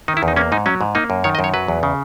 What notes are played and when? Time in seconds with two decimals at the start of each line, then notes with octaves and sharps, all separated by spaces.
0.08 D#3 D#4
0.17 E4
0.23 E2
0.28 D#4
0.36 A#3 C#4
0.52 G#2 D#4
0.66 F#3 C#4
0.81 G#2
0.95 A#3 D#4
1.10 F#2
1.24 D#3 C#5
1.35 D#5
1.39 F#2
1.44 C#5
1.54 F#3 B4
1.68 E2
1.83 C#3